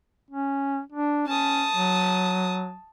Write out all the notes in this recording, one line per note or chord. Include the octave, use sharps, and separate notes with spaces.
C#4
D4
C#4 A5 D#6
F#3